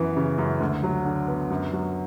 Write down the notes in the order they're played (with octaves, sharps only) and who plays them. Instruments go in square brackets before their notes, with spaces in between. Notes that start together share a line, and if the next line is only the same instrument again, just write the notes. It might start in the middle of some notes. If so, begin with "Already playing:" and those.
Already playing: [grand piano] F#2 E3 B3
C#3
F#2
D2
F#3
D3
B3
F#2
F#3